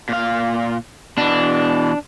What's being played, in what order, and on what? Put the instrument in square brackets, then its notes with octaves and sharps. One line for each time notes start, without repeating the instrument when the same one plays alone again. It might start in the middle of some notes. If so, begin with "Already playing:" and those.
[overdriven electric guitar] A#2 F5
[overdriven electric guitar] B2 E3 [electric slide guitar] D4